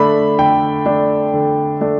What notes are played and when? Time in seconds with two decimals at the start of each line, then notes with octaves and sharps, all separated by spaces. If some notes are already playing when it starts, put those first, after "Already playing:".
Already playing: D3 A3 D4 B5
0.39 D3 G5
0.86 A3 D4
1.34 D3
1.81 A3 D4